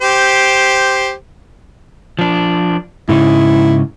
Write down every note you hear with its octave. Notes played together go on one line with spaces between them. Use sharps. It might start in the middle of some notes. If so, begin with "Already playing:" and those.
G4 C5
F3 D4
G#2 C#3 D#4 E4